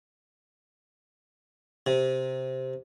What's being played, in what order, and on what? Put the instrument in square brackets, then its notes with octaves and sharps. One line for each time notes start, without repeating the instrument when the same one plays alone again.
[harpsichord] C3